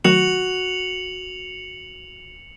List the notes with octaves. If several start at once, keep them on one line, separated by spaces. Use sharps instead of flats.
D#3 F#3 A3 F#4 C#7 F7 F#7